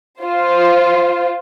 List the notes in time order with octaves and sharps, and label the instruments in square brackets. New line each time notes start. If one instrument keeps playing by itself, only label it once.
[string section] F4 C5